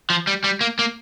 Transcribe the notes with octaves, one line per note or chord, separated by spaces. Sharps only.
F3
G3
G3
A#3
A#3